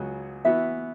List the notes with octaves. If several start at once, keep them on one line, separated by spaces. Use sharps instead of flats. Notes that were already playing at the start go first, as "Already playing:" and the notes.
Already playing: C#2 C#3 F#3
E3 B3 F#4 E5